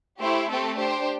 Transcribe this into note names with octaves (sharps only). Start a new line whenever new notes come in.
A3 E4 G4 C5
A3 C4 G4 A4
D4 G4 C5